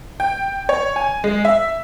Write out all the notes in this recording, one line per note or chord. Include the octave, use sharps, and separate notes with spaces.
G5
C#5
G#5
G#3
E5